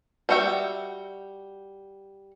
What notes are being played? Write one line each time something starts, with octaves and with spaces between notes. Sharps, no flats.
G3 D4 F#4 E5 G5